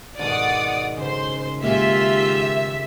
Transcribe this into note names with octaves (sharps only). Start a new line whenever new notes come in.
G#1 B2 D5 F#5 D#6
C#3 C5 C6
D#3 G#3 A#3 F4 G4 E5